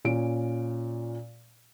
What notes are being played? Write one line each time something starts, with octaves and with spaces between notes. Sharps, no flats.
A#2 C#4 D7